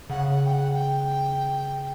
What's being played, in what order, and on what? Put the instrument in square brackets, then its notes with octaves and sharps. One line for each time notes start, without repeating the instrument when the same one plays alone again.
[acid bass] C#3 [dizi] F#5
[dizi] F#5
G5
F#5
G5